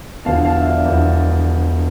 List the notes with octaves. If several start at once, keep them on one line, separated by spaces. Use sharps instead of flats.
E1 E2 D3 F3 F5 A5
F5 A5
E5
D5 F5
E1 E2 D3 F3